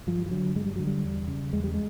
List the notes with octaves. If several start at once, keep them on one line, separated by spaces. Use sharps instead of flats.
G2 F3
F3
D3 F#3
G2 G#3
G3
D3 F#3
G3
E2
C#3
E2 G#3
G3
G#3